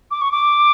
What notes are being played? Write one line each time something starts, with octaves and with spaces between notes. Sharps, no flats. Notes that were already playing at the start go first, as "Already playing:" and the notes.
D6
C#6
D6